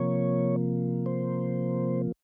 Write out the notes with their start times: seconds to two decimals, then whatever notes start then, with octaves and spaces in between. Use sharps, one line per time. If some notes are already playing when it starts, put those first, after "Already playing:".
Already playing: C3 F3 A#3 C#5
1.06 C5